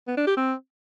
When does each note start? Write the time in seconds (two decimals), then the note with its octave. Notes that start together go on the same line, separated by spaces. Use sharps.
0.08 B3
0.17 D4
0.27 G4
0.37 C4